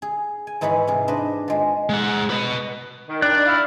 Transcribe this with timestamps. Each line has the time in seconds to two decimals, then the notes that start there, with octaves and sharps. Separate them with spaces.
0.02 G#4
0.47 G#5
0.61 G#2 E3 D#4 G#4 C#5 B5
0.87 C3 G#4 F5
1.08 D4 B4 C5 D#5
1.48 F3 G#3
1.89 G#3 F#5
2.30 B4 D#5
3.08 D#3
3.22 D#3 G3 D4 D5 F#6
3.47 E4 F5